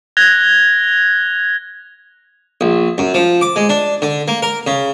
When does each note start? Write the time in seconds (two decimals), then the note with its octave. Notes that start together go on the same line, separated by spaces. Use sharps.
0.17 F#6 G#6 A#6 F7 G7
2.61 A#1
2.98 F#2
3.14 F3
3.41 D6
3.56 G#3
3.69 D4
4.02 D3
4.28 A#3
4.42 A#4
4.67 C#3